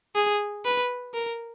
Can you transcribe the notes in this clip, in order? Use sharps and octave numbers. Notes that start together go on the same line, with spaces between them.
G#4
B4
A#4